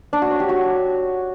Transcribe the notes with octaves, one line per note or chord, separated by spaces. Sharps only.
D4
F#4
C#5
G4
F#4